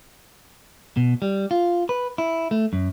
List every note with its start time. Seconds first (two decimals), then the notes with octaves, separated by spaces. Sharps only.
0.97 B2
1.22 G3
1.51 F4
1.89 B4
2.18 E4
2.51 A3
2.73 F#2